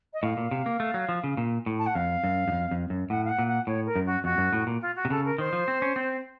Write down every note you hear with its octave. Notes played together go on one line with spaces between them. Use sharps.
D#5
A2 F5
A#2
C3
A#3
A3
F#3
F3
C#3
A#2
A2
A5
F#5
F2 F5
F#2
F#2
F2
F2
F#2
A2 F#5
F5
F#5
A#2
F#5
A2 C#5
A#4
F#2
F#4
F2 F#4
F#2
A2
A#2
F4
F#4
C3
C#3 A4
A#4
D#3 C5
F3
C4
C#4
C4